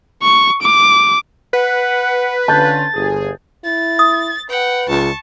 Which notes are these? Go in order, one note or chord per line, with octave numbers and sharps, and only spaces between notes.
C#6
D6
B4 F#5
D3 C#4 F4 A5 G6 A6
G1 G#4
E4 A6
D#6
B4 F#5 G5
C#2 A5 C#6